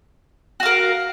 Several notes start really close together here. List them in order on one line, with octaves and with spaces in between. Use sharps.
F#4 F5 A#4